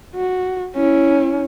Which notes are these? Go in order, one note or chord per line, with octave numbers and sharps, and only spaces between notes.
F#4
C#4 E4